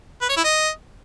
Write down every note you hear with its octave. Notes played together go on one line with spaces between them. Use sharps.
B4
C#5
E4
D#5